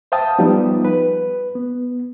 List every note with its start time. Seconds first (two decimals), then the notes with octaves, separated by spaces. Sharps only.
0.12 C5 E5 F5 G5 A5 D#6
0.39 F3 G3 B3 D#4
0.85 B4
1.55 B3